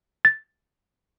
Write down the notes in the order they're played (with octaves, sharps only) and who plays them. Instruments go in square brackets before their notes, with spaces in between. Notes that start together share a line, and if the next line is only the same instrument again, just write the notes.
[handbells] A6